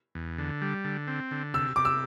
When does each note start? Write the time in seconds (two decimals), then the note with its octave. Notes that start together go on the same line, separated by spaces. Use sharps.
0.15 E2
0.38 D3
0.62 G3
0.85 D3
1.07 C4
1.31 D3
1.54 C3 E6
1.76 C3 D6
1.85 E6